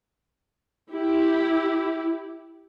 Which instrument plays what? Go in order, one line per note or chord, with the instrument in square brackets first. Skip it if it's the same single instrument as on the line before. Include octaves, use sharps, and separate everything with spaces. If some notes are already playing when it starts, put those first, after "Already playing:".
[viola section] E4 G4